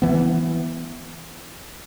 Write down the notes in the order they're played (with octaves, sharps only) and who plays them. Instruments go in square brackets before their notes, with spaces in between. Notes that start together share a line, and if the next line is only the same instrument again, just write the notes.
[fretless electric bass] E3 B3